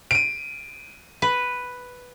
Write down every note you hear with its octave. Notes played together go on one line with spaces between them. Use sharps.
D7 D#7
B4